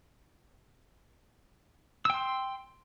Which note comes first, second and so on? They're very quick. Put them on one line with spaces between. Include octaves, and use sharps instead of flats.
E6 G5 C6